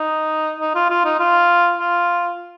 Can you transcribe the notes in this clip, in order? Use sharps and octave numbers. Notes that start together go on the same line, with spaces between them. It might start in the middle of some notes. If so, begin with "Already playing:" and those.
Already playing: D#4
D#4
F4
F4
D#4
F4
F4